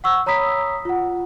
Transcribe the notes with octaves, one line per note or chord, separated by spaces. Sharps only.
F#5 C#6 E6
C#5 A#5 B5 D#6 B6
F4 F#5